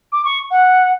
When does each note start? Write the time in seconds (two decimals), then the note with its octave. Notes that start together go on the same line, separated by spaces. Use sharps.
0.12 D6
0.25 C#6
0.51 F#5